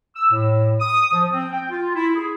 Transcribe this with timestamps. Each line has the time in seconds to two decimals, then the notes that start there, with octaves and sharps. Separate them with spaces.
0.16 E6
0.32 A2
0.80 D#6
1.13 F3
1.32 C4
1.53 G5
1.71 F4
1.95 E4
2.16 G#4